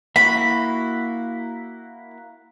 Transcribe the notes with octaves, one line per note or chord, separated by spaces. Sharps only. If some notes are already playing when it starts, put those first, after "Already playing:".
A#3 E4 F#4 B5